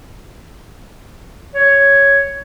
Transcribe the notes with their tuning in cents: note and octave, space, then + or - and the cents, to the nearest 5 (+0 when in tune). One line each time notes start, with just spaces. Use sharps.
C#5 +5